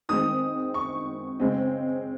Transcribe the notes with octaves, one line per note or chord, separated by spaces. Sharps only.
D#3 G#3 C4 D#6
C#6
C#3 G#3 C4